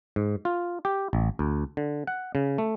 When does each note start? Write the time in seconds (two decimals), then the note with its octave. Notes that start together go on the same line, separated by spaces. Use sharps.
0.16 G#2
0.45 F4
0.85 G4
1.13 A1
1.39 D2
1.77 D3
2.07 F#5
2.35 C#3
2.58 A3